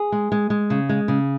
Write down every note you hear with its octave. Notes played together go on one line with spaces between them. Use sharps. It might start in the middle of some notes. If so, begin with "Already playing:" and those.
Already playing: G#4
G#3
G#3
G#3
C#3
G#3
C#3